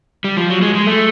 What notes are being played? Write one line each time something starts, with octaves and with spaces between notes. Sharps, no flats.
G3
F3
F#3
G#3
G#3
A3